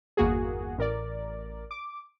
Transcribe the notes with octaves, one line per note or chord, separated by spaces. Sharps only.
G1 E2 A#3 F#4 G#4
A1 A#4 D5
D6